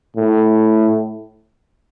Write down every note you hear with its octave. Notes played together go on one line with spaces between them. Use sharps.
A2